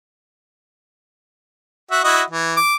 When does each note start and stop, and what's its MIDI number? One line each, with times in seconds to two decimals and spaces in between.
1.91 2.02 66
1.91 2.02 76
2.04 2.22 64
2.04 2.22 66
2.04 2.22 75
2.30 2.56 52
2.57 2.76 86